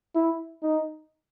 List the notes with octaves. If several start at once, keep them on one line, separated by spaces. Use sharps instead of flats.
E4
D#4